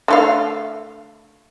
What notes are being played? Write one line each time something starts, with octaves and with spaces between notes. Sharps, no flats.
D3 A3 F5